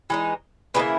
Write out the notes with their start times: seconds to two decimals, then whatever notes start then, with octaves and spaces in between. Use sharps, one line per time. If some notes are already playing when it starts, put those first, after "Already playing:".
0.10 E3 G#3 D#4
0.74 C#3 E3 A#3 E4 B4 D#5